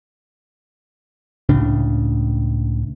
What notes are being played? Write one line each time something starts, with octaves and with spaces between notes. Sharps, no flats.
C#2 A2 C#3 D4